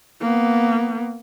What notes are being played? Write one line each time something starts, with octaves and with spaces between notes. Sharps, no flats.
A#3 B3